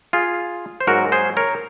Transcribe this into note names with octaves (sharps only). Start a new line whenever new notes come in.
F4 G#4
C5
G#2 F#3 A#3 F#4 A#4
G#4 C5
A#4 C#5